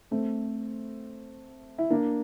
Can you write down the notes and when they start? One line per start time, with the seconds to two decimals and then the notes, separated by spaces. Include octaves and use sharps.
0.11 A3 C4
1.78 E4
1.90 A#3 D4